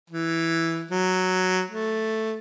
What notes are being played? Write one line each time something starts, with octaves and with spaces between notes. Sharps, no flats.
E3
F#3
A3